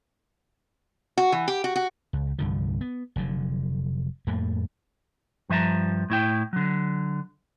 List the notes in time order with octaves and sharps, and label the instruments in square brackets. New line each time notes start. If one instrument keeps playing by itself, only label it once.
[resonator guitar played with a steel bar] F#4
E3
G4
F#4
F#4
[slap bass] C#2
C2 G2 D3 F3
B3
F1 D3 F#3
F2 A2 A3 A#3
[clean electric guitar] G2 F3 E5 A5 A#5
A2 E4 G5
D3 F#3